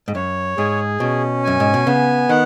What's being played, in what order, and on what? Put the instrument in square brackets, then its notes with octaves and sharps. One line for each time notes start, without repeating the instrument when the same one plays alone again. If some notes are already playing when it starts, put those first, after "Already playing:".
[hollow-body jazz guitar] G#2
[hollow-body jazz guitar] F#2 [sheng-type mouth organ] C#5
[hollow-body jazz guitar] G#2 [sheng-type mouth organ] G#4
[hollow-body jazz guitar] B2 [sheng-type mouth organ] C#4
[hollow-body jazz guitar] F#2 [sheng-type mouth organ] G#5
[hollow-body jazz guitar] G#2
B2
[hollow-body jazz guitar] C#3 [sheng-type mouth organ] B3
[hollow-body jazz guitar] D#3 [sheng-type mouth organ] F#5